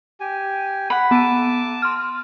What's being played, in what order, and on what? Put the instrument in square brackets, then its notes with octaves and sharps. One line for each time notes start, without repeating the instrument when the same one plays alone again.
[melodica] G4 G#5
[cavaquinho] F#5 B5
[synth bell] B3 D#7 [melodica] A5 D6
[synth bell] C6 F6